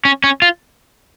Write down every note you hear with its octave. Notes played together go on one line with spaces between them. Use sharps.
C#4
C#4
F4